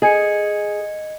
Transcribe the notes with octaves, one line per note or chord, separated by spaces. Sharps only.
G#4 D#5 G#6 C#7